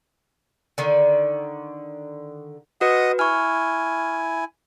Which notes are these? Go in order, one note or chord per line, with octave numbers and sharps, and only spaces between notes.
D3 D#3
F#4 B4 D#5 F#5 D#6
E4 G#5 C#6 F6